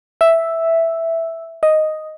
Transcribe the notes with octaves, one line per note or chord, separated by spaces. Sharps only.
E5
D#5